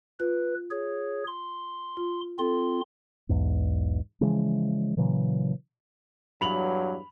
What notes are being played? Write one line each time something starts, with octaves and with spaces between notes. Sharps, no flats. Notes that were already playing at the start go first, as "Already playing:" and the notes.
F4 B4
G#4 C#5
C6
F4
C4 F4 A4 C6
B1 E2 G#2
C#3 E3 F3 G#3
A#2 C#3 E3 F#3
E2 G2 F#3 B5 F7 F#7